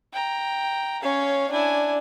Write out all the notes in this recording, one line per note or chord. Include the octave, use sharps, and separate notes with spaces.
G5 A#5
C#4 C#5 F5
D4 E4 G#5